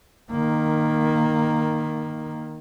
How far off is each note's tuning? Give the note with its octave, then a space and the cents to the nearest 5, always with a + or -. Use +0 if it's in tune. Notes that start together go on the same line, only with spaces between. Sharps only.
D#3 -10 A#3 +5